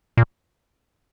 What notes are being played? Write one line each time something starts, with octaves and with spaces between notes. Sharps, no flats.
A#2